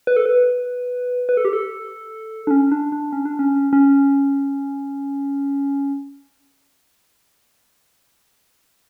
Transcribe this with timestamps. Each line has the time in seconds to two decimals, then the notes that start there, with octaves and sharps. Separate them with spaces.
0.07 B4
0.16 A4
0.26 B4
1.29 B4
1.37 A4
1.45 G4
1.53 A4
2.47 D4
2.51 C#4
2.72 D4
2.92 D4
3.13 C#4
3.25 D4
3.39 C#4
3.73 C#4